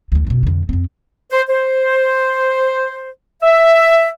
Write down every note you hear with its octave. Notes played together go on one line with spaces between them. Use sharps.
D2 D#3
F#2 B2
F2 D3
F2 C4
C5
C5
E5